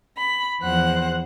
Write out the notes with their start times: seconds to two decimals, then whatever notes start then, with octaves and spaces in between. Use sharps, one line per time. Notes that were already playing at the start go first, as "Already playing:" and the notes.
0.17 B5
0.63 E2 F3 C5 F#5 F#6